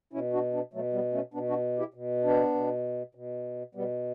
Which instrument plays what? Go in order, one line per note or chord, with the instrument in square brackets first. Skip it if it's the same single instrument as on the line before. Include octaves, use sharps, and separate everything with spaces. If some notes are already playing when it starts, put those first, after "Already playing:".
[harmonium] B2 C#4 E4
D4 F#4
B3 D4
B2 F#3 A3
G3 B3
A3 C#4
B2 B3 D4
D4 F#4
E4 G4
B2
B3 D4
B2
B2
B2 G3 B3